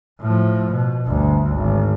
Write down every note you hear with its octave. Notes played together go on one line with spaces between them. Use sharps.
A2 F3
B2
G1 D2
G#1